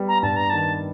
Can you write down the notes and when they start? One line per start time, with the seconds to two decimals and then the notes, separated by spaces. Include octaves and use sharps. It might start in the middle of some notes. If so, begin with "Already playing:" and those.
Already playing: G3 B3
0.08 A#5
0.23 G2 A5
0.36 A#5
0.50 D#3 A5